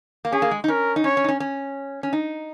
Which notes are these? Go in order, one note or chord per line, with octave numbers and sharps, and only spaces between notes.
A#3
C#4 G#4
A#3
G#3
D#4
C#4 A#4
D#4
C#4 C#5
C#4
D#4
C#4
C#4
C#4
D#4